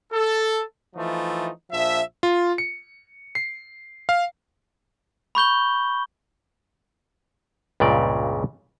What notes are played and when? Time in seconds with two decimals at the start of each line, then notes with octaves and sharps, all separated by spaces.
0.13 A4
0.96 E3 F3 A3 D#4 F4
1.72 A#1 F3 E5
2.23 F4
2.58 C#7
3.35 C7
4.09 F5
5.35 B5 C#6 G6 G7
7.80 C#2 G2 A#2 C#3 D5